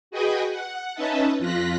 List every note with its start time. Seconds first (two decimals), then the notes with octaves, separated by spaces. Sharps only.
0.11 F#4 G#4 B4 D#5 G5 G#5
0.50 F#5
0.94 C#4 D#4 B4 D#5 E5 A5
1.39 F2 F4 F#6 A#6 B6